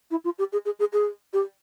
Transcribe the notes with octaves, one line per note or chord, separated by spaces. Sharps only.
E4
F4
G4
G#4
G#4
G#4
G#4
G4